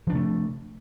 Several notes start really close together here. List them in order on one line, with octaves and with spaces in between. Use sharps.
F3 D4 C3 A3